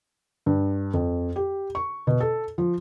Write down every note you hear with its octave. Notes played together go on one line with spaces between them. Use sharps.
G2
F2
G4
C#6
B2
A4
F3